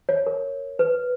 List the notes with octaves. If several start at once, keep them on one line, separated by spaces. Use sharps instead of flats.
C#5
A#4
B4